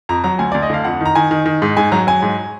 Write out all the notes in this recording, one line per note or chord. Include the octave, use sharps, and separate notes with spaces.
F2 A#5
F#3 A#5
D2 G#5
D2 D5
D#5
D3 F5
F2 F#5
D#3 A#5
D#3 G#5
D#3
D#3
G#2
G#2 G#5
F#3 A#5
F#3 G#5
G#2